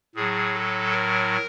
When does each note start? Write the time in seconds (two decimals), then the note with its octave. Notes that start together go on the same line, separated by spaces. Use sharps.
0.15 A2 F#3 G#4
0.54 A4
0.91 A#4